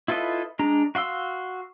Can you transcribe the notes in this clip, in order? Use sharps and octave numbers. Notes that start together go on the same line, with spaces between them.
E4 F4 A4 B4 D#5
G#3 D4 A#5
F#4 F5 C6 E6